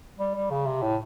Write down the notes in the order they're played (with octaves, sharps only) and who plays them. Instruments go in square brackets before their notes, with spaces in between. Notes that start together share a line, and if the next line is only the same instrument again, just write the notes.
[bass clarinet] G3
G3
C#3
C3
A2